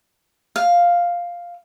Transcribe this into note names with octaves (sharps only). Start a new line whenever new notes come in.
F5